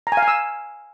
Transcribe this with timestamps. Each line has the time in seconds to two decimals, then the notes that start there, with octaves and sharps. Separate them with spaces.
0.07 A#5
0.12 G#5
0.17 F5
0.23 G#5
0.28 E6